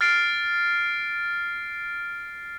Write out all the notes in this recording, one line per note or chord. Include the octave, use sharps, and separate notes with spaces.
F6 A6 C7 D7